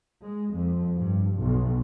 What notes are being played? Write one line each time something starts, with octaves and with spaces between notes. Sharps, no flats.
G#3
F2
G2
B1